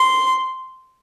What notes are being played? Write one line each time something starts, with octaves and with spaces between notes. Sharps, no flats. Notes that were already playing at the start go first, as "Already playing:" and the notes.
Already playing: C6